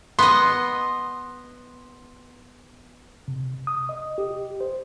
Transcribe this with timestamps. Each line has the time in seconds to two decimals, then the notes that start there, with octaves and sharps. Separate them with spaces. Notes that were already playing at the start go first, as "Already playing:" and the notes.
0.19 B3 D#5 C6
3.28 C3
3.67 D#6
3.89 D#5
4.18 G4
4.61 C5